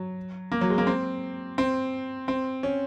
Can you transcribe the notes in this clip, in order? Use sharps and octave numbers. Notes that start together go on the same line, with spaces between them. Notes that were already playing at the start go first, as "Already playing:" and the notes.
Already playing: F#3
A#3
F#3
G#3
A#3
C4
C4
C4
C#4